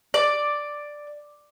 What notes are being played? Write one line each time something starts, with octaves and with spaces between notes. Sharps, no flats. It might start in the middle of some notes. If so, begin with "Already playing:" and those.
D5